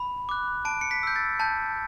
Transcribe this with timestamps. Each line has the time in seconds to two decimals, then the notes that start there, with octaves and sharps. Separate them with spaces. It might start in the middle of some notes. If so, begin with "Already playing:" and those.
Already playing: B5
0.29 D6 F#6
0.65 A5 D7
0.81 C#7
0.91 B6
1.03 E6 G6
1.16 A6
1.40 A5 G6